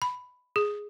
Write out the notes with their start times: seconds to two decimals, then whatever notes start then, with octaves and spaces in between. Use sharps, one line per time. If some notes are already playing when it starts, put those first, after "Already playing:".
0.02 B5
0.56 G#4